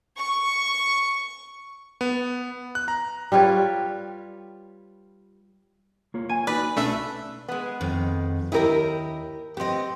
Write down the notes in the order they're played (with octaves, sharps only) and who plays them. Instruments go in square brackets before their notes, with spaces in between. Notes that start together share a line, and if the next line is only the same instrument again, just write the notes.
[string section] C#6
[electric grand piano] B3
F#6
A#5
[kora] G3 F4 B4 C#5
[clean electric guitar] A#3 F4 C#5
[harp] G#5
[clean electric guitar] D#4 F#4 [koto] B4 [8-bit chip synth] D5
[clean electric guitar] B1 C#4 A5 [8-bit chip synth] A3 D4 E5
[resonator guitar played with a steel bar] G#3 B3
[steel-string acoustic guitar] F2 D#3
[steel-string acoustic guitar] D#2 D#3 D#5 [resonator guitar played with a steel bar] E4 G4 A#4
[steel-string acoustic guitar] B3 D#5 [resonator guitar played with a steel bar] C4 G4